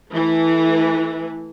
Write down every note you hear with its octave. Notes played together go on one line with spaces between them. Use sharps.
E3 A3